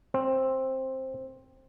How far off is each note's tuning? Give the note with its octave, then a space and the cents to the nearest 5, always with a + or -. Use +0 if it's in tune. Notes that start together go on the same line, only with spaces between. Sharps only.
C4 +10